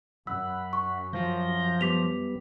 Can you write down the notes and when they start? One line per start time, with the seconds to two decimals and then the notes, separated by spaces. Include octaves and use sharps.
0.27 F#2 F#5 B5 E6
0.73 C#6
1.13 F3 F5 G6 A#6
1.81 G3 B3 D6 B6 F7